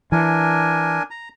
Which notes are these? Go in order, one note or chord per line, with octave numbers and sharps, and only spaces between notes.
E3 D4 A#4 G#5
A#5